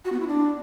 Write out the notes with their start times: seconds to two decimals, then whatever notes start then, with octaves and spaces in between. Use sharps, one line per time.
0.05 F#4
0.12 B3
0.20 E4
0.27 D4